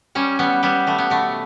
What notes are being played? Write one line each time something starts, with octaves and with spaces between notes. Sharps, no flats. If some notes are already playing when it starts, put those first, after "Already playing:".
G3 C#4
G3 B3
G3 B3
G3 A3
B3
B2 A3